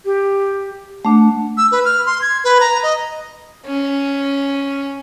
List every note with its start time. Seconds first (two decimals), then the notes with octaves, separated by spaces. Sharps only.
0.05 G4
1.05 A3 D4 F#5
1.57 E6
1.72 B4
1.85 F6
2.06 C6
2.21 G#6
2.44 B4
2.60 A#5
2.83 D#5
3.66 C#4